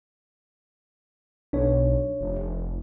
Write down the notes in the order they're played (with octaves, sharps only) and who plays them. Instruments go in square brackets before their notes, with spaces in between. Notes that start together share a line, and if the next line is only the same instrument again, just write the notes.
[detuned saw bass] B1 [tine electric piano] D4 C#5
[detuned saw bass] F1